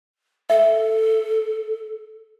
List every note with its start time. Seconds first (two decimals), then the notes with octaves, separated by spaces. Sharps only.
0.50 A4 E5